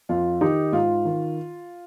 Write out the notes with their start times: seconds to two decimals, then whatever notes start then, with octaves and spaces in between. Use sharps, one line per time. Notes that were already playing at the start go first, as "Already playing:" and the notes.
0.09 F2 F4
0.41 D#3 D#4 G4
0.72 G#2 F4
1.05 D#3